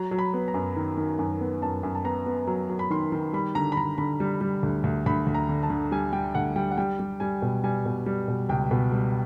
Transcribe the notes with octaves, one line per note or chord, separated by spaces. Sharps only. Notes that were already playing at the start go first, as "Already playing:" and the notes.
Already playing: F#3 A#5
F#3
B5
B3
A#5
F#2
D#3
D#3
F#2
B3
F#2 A5
F#2
A5
B3 A#5
B3
F#3
F#3
B5
D#3 C6
D#3
G3 B5
D3 A#5
B5
D3 A#5
D3 B5
G3
G3
D2
D2
D2 B5
D2
A#5
D3
A5
D3
G3 G#5
G3 G5
D2 F#5
G3 G5
F#5
G3 G5
G3
G3 G#5
B2
G3 G#5
B2
G3
B2
C#2 G5
B2
G3